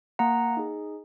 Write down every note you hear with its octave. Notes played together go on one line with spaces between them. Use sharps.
A#3 F#5 A#5
D#4 G#4